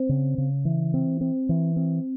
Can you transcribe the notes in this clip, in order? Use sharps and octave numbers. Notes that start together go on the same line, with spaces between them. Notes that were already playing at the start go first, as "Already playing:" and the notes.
Already playing: C4
C#3
C#3
E3
C4
C4
E3
C4